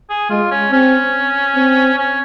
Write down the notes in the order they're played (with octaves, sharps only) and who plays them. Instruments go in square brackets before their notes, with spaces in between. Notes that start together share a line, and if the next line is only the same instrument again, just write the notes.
[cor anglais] G#4
[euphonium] G#3 [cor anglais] F4
[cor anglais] C#4
[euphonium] C4 [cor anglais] C#4
[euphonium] C4
[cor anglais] C#4